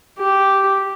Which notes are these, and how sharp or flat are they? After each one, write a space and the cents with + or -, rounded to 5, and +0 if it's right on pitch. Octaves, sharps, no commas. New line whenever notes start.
G4 -5